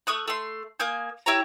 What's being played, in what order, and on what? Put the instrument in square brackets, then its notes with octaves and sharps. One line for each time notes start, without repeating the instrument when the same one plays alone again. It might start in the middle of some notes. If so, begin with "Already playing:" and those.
[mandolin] A3 C#6 D#6 F#6
A3 C6
A#3 G#5 D#6 G6
E4 G4 C#5 A#5